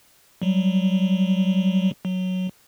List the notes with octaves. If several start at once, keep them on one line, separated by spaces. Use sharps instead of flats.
F#3 G3
F#3